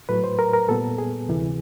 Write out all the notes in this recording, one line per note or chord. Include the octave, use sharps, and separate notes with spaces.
A2 F#3 A3 B4
C5
A#4
A#4
A#2 G3 B3 A4
G#4
D2 C3 E3